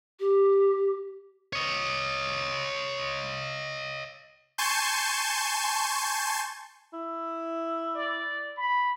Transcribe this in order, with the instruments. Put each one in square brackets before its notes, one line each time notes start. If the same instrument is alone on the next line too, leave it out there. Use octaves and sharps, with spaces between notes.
[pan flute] G4
[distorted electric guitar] C#5 D#5
[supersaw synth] G#5 A5 C6 C#6 G6
[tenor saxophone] E4
[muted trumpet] D5
B5